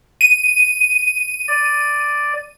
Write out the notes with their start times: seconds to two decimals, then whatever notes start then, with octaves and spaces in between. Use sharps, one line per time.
0.21 D#7
1.48 D5